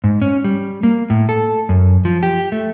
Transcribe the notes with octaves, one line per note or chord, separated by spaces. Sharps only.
G#2
C#4
G3
A#3
A2
A4
F#2
F3
G4
A3